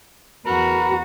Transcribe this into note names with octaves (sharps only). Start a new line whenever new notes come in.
E2 F#4 A#4 B4 A#5